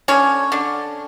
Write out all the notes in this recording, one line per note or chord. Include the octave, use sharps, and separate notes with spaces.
D3 C#4 C#5
D3